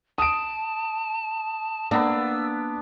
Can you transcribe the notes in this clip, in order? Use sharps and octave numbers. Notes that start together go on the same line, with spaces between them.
A5 D#6 D7
A#3 B3 D4 E6